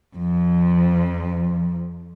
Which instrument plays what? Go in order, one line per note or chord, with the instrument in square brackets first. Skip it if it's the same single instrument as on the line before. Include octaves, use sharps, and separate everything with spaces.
[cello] F2 F3